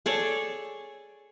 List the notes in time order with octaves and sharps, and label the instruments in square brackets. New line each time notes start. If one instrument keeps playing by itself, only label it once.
[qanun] G#4 A4 C#5 D5